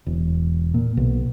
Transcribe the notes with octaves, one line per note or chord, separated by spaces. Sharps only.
E1
A#2
B1